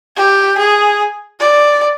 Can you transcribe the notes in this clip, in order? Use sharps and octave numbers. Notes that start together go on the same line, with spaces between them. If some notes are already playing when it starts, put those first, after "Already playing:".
G4
G#4
D5